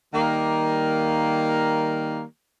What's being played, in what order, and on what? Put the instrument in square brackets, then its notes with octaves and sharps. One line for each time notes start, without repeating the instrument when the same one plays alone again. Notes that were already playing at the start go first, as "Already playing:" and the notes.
[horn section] D#3 G3 A#3